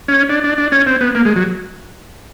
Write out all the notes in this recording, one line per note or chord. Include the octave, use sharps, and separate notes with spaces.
C#4
D4
D4
D4
C#4
C4
B3
A#3
G#3
F#3